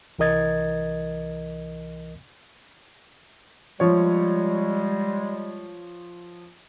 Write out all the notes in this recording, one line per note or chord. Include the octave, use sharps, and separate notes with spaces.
C2 E3 A#4 D#5 G#6 A6
F3 G3 G#3 C#5